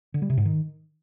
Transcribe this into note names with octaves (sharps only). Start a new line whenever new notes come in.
D3
G3
C3
G#2
D#3